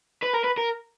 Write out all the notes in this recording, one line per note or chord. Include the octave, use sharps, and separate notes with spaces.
B4
A#4
B4
A#4